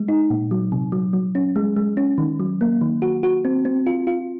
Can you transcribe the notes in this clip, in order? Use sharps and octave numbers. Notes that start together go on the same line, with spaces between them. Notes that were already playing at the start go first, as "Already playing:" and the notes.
Already playing: G#3
D#4
A#2
F#3
C3
F#3
F#3
C#4
G#3
G#3
C#4
D#3
F#3
A#3
D#3
F#4
F#4
C4
C4
F4
F4